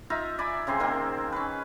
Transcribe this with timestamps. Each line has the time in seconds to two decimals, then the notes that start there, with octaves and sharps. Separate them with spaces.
0.10 D#4 F4 E5 A#5
0.38 D5 G#5 B5 D6
0.67 C#3 C4 G#4 C6
0.80 D#3 A#3 C4
1.32 C#4 B4